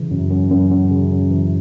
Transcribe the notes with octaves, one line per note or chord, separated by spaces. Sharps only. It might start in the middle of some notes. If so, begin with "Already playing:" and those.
Already playing: C#3 E3
F#2
F#2
F#2
F#2
C#3
F#2
E3